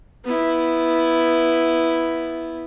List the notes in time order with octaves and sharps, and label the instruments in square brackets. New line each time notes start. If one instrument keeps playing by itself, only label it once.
[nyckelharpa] B3 E4